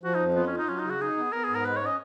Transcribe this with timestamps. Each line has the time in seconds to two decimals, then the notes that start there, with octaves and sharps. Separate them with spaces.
0.03 F3 F#4
0.15 D#4
0.20 F2
0.35 B3 F4
0.47 C#4
0.52 F4
0.58 D#4
0.68 F#3 C#4
0.79 D#4
0.84 C#3
0.90 F#4
1.01 D#4 G#4
1.17 B3
1.33 B3 A#4
1.44 G#2 G#4
1.55 A#4
1.65 G#3 B4
1.76 C#5
1.82 C#4 D#5